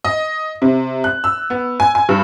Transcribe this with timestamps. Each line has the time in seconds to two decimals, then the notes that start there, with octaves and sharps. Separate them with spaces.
0.04 D#5
0.62 C3
1.04 F#6
1.24 E6
1.50 B3
1.80 G#5
1.95 G#5
2.09 G2